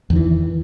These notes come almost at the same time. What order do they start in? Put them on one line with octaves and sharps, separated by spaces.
E2 D#3 E3